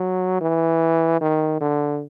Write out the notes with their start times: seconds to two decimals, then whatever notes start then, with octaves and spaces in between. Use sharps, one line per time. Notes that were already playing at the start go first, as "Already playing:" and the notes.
Already playing: F#3
0.41 E3
1.21 D#3
1.60 D3